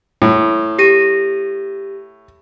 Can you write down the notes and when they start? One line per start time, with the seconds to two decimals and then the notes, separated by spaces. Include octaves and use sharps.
0.22 A2
0.79 G4 A#6 D#7